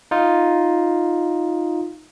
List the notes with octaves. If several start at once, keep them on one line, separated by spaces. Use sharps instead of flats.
D#4 F4